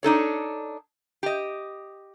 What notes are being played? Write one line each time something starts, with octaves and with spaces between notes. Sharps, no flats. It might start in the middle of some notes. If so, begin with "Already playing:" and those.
D4 D#4 A4 C#5
G4 D#5